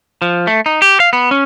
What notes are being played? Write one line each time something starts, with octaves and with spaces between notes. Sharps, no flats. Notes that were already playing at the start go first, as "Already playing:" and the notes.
F3
A3
D#4
G4
F5
B3
C#4